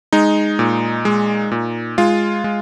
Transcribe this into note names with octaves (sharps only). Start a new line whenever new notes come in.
G#3 D#4
A#2
G#3
A#2
G#3 F4
G#3